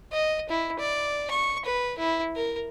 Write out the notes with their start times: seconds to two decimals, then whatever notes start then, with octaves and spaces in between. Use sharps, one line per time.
0.12 D#5
0.49 E4
0.79 D5
1.30 C#6
1.65 B4
1.98 E4
2.36 A#4